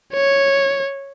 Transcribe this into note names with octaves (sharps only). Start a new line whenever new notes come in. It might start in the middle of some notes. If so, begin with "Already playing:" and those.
C#5